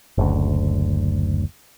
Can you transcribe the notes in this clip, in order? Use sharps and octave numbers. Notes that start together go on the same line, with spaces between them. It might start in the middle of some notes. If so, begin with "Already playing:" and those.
F#1 D2